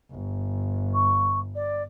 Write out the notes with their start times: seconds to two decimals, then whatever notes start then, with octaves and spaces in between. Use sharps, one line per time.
0.11 G1
0.94 C#6
1.55 D5